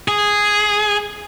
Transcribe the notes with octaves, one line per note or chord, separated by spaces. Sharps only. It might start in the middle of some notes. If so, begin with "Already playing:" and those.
G#4